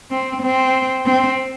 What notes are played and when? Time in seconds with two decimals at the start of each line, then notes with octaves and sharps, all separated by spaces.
0.11 C4
0.43 C4
1.06 C4